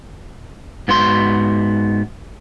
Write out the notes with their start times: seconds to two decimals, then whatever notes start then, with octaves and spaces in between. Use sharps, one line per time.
0.88 G#2 B3 F#4 C6